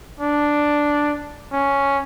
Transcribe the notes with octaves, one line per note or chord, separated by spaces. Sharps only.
D4
C#4